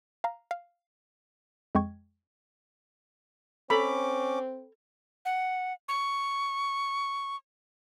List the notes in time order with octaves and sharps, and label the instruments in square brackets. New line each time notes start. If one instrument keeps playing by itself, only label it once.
[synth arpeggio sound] F5 A#5
F5
F2 G#3 D#5 G5 C#6 G#6
[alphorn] C4 [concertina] C#4 D6 [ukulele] A4 A#5 [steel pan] B5
[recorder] F#5
C#6